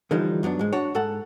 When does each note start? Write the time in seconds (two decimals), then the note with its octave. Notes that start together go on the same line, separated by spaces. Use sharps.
0.11 D3 E3 F3 G3 D4 D#4
0.43 F#2 F#3 B3 D4
0.59 G#2 G#3
0.73 D4 F#4 C#5
0.95 G#2 A4 F#5